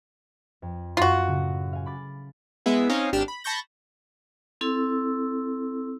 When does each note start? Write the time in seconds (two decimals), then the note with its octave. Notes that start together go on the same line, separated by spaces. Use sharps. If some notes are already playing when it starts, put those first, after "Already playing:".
0.62 F2
0.97 F#2 F4 F#4
1.27 A2 C#3
1.73 F5 G#5
1.86 B5 D6 A6
2.66 G#3 B3 E4 G#4 E5
2.90 C4 C#4 D#4 C#5 D#5 F5
3.13 G#1 D4 G4 F6 E7
3.28 B5
3.44 A5 B5 C#6 G6 A#6
4.61 C4 E4 A4 E6